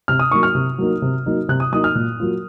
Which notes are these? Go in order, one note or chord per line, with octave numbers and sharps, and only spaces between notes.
C3 F6
D#6
F#3 A#3 D#4 C#6
F6
C3
F#3 A#3 D#4
C3
F#3 A#3 D#4
C3 F#6
D#6
F#3 A#3 D#4 D#6
F6
A#2
F#3 A#3 F4